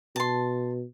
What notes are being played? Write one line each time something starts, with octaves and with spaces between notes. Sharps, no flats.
B2 A5 C6